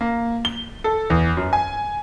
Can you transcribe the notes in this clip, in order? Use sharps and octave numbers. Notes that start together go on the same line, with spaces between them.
A#3
G7
A4
E2
F#2
G#5